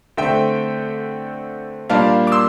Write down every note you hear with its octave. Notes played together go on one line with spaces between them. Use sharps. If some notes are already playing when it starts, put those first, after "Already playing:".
D3 A3 C4 E5 G5
A#2 G3 A#3 D4 F5 A5
D6
C6 E6